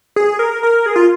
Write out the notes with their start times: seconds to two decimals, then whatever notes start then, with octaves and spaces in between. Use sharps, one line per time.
0.16 G#4
0.39 A#4
0.63 A#4
0.86 G#4
0.96 F4